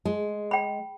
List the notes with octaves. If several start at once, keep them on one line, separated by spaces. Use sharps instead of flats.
G#3
G5 B5